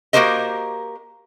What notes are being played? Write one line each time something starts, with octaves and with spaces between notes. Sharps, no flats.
A#3 F#4 G4 A#4 C5 D#5